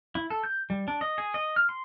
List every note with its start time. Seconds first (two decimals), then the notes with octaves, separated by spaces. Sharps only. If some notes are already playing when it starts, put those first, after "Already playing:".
0.15 E4
0.30 A4
0.44 G6
0.70 G3
0.88 D4
1.01 D#5
1.18 G#4
1.34 D#5
1.56 F6
1.69 C6